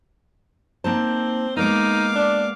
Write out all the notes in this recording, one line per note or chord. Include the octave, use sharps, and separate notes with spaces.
A#3 C4 D#4 C5 A5
G#3 A#3 B3 D#4 F5 D6
D4